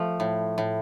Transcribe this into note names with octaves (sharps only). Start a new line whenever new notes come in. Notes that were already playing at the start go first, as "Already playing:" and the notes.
Already playing: F3 A3
A2
A2